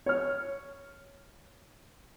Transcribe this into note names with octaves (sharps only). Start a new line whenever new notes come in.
C#5 F6